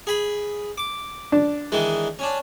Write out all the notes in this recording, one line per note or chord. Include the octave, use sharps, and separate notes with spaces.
G#4 B5
D6
D4
D#3 E3 G#3
C#4 D4